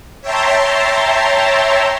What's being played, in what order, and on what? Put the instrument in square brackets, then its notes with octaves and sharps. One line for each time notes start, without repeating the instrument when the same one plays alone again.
[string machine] C#5 E5 G5 A5 A#5 C6